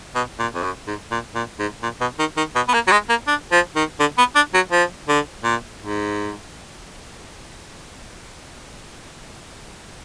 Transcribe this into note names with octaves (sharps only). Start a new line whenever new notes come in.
B2
A#2
F2
F#2
G#2
A#2
A#2
G#2
A#2
B2
D#3
D#3
B2
B3
A#3
F#3
G#3
A#3
D4
F3
D#3
D3
B3
D4
F#3
F3
D3
A#2
G#2